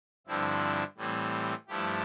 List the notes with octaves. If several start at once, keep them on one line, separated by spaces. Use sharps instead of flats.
G2 D3 F3 C4 E4
A2 E3 G3 C4
G2 F3 A3 E4 G4